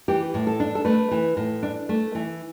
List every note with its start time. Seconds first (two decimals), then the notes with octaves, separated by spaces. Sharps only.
0.08 E3 G4
0.34 A2
0.47 A4
0.60 D4
0.75 A4
0.85 A3 B4
1.11 E3
1.37 A2
1.63 D4
1.89 A3
2.15 E3